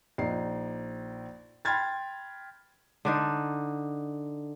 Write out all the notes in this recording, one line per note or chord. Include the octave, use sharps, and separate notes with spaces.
A#1 D#4 C7
G5 B5 C6 F6 G#6 A6
D3 D4 D#4